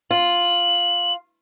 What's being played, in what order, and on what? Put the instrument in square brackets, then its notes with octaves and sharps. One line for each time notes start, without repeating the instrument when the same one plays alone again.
[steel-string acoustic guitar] F4 [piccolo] F#7